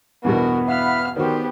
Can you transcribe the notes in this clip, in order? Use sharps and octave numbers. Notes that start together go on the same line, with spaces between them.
E2 G2 B2 B3 F#4 A#4
E4 F5 F#5 B5 F6
D#3 G3 B3 F#4 G4 A#4 C5